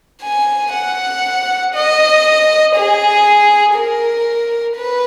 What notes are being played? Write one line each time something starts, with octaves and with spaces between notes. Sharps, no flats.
G#5
F#5
D#5
G#4
A#4
B4